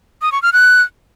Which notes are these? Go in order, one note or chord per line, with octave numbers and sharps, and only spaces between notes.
D#6
C#6
F6
F#6